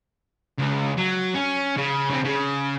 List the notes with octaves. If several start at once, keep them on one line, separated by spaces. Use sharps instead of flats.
C#2
F#3
C#4
C#3
C#3 C4
C#3